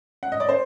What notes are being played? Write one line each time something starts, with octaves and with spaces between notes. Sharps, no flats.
F#5
D#5
D5
C5